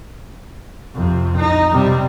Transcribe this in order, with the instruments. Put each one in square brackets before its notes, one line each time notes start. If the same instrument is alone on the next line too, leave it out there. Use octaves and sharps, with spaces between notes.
[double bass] F2 C3
D#4
C3 G3